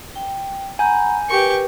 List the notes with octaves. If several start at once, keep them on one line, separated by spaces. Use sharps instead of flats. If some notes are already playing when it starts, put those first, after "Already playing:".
G5
F#5 G#5 A#5 B5 G6
G4 A#4 B4 C#6